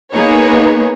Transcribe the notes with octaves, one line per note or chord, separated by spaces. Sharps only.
A#3 B3 D#4 G#4 B4 C#5